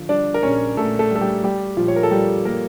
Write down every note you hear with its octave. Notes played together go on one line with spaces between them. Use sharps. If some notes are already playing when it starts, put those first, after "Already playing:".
Already playing: D3 F3
G3 D4 D5
A#4
A#1 C#4 C#5
A#1 A3 A4
A3 A4
G3
A4
G3 G4
G3 G4
A#1 F3 F4
C#5
A#4
A4
G3 G4
G3 A#3 A#4